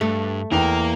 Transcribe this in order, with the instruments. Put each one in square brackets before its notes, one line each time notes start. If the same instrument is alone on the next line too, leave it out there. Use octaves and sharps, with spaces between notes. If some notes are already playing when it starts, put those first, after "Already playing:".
[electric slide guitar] G2 [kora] A3
[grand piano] E2 G5 [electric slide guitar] A#3 A#4